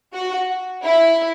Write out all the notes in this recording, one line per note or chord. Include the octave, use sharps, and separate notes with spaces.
F#4
E4